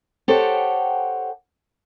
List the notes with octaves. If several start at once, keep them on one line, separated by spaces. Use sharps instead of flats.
G4 A4 C5 C#5 F#5 G5